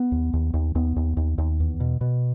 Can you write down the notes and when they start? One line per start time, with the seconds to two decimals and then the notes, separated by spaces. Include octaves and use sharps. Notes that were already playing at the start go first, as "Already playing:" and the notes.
Already playing: B3
0.12 D#2
0.33 D#2
0.54 D#2
0.75 D#2 B3
0.96 D#2
1.17 D#2
1.38 D#2
1.60 E2
1.80 B2
2.01 B2